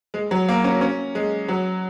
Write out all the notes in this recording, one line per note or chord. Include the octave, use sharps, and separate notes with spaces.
G#3
F#3
A#3
C#4
C#4
G#3
F#3